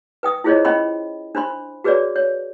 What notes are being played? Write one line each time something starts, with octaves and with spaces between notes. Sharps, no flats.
B4 G5 D#6
E4 F4 G#4 C5 C#5 D#5
C#4 D#5 G5 B5 C6
D4 C5 B5 C6
F#4 G#4 B4 C#5 D5
C#5